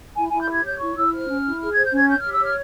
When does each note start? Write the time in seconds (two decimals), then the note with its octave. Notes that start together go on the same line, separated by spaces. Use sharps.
0.16 E4 G#5
0.29 E4 G#5
0.41 G6
0.49 G4 G#6
0.64 C#5 G6
0.80 E4 C#6
0.96 E4 E6
1.12 C5 F6
1.29 C#4
1.45 E4
1.60 G#4 F6
1.73 C5 G#6
1.84 G6
1.92 C#4 G#6
2.08 C#5 G6
2.20 G4 F6
2.33 E6
2.40 C#5 F6